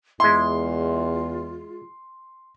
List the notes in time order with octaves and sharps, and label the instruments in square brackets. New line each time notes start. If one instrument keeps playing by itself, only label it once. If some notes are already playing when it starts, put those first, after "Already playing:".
[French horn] E2 [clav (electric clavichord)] G#3 E4 [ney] F4 [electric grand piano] C6